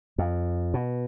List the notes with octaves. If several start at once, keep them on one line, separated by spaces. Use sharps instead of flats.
F2
B2